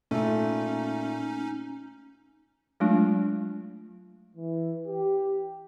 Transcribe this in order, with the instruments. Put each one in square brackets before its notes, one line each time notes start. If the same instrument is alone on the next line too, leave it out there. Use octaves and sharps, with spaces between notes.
[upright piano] A#2 A3 [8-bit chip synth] C#4 D#4
[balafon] F#3 G#3 A3 D4 F4
[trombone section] E3
G4